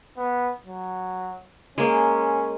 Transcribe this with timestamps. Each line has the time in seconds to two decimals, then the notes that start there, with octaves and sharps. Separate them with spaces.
0.17 B3
0.66 F#3
1.78 G#3 A#3 C#4